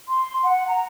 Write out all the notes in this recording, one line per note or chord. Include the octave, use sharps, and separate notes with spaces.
C6
F#5
A#5